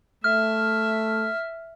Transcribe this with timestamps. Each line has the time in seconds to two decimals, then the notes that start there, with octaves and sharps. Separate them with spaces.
0.24 A3 E5 F6